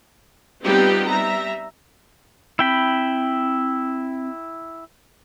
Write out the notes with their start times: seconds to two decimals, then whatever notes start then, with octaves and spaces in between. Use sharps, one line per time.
0.64 G3 B3 C4 D#4 F4 G4
1.11 G3 E5 A#5
2.59 C4 E4 G5 B5